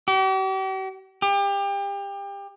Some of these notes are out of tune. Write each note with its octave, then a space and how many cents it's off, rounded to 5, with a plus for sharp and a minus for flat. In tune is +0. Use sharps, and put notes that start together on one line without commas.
G4 -45
G4 +30